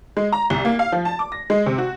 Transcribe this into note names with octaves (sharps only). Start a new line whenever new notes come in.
G#3
A#5
C2
A#3
F5
F3
A5
D6
A#6
G#3
C3
F#4